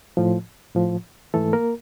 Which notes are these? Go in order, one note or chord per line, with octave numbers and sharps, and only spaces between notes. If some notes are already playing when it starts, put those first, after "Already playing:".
A2 F3
A2 F3
G#2 E3 A3 A4
A#3 A#4